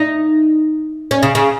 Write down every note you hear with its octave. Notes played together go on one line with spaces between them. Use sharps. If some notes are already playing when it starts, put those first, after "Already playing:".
Already playing: D#4
C#4
C#3
C#3